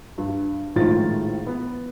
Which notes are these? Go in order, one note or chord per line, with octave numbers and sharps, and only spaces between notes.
G2
A#1 A2 D#3 G#3 F4 A6
B3